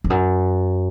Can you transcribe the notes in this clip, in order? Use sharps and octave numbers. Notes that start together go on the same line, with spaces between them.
F2
F#2